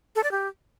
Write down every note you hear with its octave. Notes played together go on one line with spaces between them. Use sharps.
A4
D5
G4